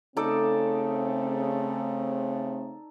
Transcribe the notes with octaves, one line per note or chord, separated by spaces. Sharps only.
C#3 A3 C4 D#4 A4 D5